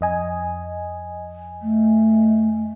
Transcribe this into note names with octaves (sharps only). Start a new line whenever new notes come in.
F2 D#5 G#5
A3